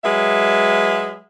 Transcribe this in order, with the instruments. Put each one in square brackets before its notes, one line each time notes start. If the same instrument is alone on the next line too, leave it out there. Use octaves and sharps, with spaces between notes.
[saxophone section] F#3 G#3 B4 E5